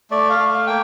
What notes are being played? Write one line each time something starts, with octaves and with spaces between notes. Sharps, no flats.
A3 D5
F5
A3
F5
A#3 G5